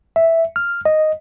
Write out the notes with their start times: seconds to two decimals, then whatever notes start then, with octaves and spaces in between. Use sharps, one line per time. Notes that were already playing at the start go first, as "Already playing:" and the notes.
0.16 E5
0.56 F6
0.85 D#5